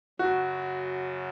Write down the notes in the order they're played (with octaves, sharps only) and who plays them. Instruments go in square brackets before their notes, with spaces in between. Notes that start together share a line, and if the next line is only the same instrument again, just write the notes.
[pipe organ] F#2 C#3 F#3 [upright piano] F#4